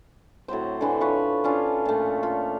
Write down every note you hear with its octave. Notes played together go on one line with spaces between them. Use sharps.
A2 F#3 C4 C5
D3 E3 A3
F3 B4 C#5
C#4 D4 F4
A#2 A3
F4